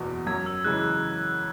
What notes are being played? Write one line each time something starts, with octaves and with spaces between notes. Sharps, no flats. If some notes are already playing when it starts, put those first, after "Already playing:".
Already playing: F#1 E2 B2
F#2 G#6
E6
C#3 E3 G#3 F#6